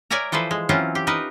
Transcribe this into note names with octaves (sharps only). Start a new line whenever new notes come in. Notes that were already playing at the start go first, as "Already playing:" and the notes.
A#4 C#5 D5 E5 G#5 A#5
E3 F3 A4 B4 C5
G#3
E3 F#3 C4 C#4 F4
G4
D#4 A#4 B4 D#5